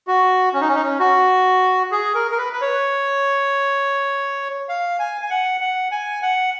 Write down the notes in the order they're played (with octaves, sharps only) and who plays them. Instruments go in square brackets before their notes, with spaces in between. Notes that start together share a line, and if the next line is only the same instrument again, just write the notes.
[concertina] F#4
C#4
D#4
C#4
D#4
C#4
F#4
G#4
A#4
A#4
B4
B4
C#5
F5
G#5
G#5
F#5
F#5
G#5
F#5